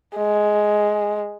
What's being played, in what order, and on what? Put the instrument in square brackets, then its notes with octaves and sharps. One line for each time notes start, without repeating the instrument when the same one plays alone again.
[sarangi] G#3